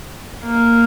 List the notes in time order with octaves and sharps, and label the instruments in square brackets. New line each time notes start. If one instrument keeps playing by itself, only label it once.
[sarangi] A#3